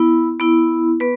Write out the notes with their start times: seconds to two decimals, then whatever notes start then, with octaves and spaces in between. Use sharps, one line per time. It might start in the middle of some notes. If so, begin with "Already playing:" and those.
Already playing: B3 E4
0.40 B3 E4
1.00 B3 B4